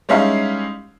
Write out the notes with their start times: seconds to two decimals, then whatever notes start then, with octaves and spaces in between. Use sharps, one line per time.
0.09 G3 G#3 C#4 D#4 E4 F5